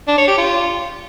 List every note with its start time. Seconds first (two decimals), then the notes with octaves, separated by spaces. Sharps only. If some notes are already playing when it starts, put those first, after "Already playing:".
0.08 D4
0.18 C#5
0.28 G4
0.38 F4